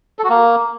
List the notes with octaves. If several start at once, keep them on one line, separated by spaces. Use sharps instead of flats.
A4
F#4
A#3